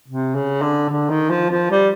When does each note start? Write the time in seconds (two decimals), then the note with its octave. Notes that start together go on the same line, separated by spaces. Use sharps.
0.08 C3
0.34 C#3
0.62 D3
0.89 D3
1.09 D#3
1.30 F3
1.50 F3
1.71 G3